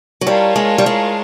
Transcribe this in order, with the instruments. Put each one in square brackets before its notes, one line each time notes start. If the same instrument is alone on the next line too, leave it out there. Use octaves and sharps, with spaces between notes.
[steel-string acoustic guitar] F#3
[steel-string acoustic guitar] G3 [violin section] F4 A#4 C#5 F5 A5
[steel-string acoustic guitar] G#3
G3
G#3